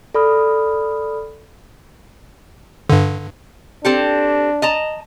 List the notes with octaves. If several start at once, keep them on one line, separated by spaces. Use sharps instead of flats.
A4 D5 B5 D#6 F6
G2 D3
C4 D4 G4 A4
D#5 A5 A#5